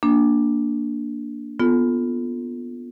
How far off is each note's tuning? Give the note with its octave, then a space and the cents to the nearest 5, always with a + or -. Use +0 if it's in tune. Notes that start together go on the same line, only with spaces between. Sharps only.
A#3 +0 D4 -5
B3 +0 F4 +0 A4 +0